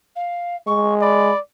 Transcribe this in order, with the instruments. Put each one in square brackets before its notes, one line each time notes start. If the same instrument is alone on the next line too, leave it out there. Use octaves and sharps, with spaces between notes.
[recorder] F5
[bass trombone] G#3 [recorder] C#6
[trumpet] D5 [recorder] B5